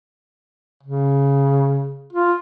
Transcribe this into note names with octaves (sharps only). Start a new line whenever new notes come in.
C#3
F4